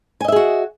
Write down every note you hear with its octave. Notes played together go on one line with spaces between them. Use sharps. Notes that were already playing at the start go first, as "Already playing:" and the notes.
F#4 G#4 D#5 E5 G#5